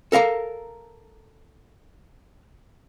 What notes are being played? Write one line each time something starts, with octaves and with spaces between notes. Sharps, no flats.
A4 A#4 F5 A#5